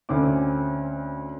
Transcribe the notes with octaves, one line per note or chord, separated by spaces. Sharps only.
D2 C4 C#4 D6